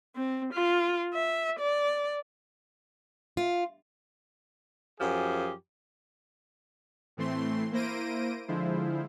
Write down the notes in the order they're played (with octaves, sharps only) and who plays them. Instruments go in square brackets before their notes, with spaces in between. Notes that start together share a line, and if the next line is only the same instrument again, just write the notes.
[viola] C4
F4
E5
D5
[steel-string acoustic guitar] F4
[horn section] F#2 F3 G4 G#4
[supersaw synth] A2 E3 A3 C4 C6
A#3 E4 C5 A#6 D7 D#7
D3 F3 G#3 E4 F4 C5